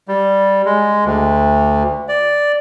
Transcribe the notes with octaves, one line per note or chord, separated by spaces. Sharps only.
G3
G#3
D2
D5